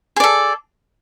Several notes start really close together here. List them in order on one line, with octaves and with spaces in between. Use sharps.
G#4 D5 A4